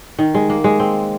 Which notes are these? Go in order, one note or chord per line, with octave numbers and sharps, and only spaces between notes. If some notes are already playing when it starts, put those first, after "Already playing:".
D#3
G#3
A#3
G#3
C4